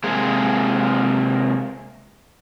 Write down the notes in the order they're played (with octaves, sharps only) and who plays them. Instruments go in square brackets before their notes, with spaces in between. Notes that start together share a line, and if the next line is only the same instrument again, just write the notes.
[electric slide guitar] C3 G#3 A#3 G#4